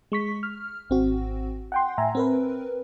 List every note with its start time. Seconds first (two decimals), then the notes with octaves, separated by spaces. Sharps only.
0.12 G#3 C#6 B6
0.43 F6
0.90 G#1 C4 F#4
1.72 F#5 G5 C6
1.98 A2 E5 G#5 A#5
2.15 C4 A#4 B4